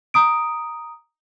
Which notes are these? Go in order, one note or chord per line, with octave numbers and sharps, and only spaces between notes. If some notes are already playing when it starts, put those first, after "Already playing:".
A#5 D#6 D7